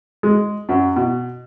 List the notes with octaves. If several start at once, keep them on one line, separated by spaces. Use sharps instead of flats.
G#3
F#2
B2